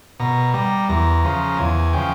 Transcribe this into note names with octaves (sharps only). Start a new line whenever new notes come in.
B2 A#5
G3 A#5
E2 A#5
C#3 F3
E2 G#5
C#3 F3 G5